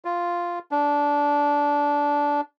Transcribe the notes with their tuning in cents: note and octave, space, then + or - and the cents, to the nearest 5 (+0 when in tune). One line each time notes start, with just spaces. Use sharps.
F4 -5
D4 -15